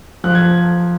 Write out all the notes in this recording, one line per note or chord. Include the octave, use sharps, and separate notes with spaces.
F3 F#6
G#6